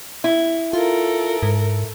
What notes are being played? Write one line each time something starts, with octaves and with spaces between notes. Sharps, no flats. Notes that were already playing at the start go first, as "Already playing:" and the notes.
E4
F4 A4 A#4
G#2